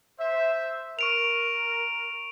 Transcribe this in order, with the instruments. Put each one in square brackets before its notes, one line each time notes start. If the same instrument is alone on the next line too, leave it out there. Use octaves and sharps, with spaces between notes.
[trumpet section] C5 E5
[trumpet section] A#4 [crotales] C#6 D7 F7